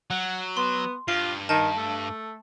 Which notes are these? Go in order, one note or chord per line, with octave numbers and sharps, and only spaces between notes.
F#3 F#5
B3 C6
G2 F4 C7
D#3 A5 G6
A3